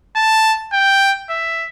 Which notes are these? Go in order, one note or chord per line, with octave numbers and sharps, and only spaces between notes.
A5
G5
E5